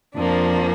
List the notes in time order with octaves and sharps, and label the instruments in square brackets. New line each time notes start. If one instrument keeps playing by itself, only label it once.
[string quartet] F2 F3 A#3 D4